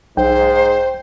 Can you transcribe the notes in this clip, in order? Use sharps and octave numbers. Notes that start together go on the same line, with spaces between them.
B1 G#2 C5 G5